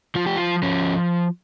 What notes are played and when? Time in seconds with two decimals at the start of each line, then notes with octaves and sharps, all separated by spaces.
0.15 F3 F4
0.26 G4
0.36 F4
0.63 F3 C#4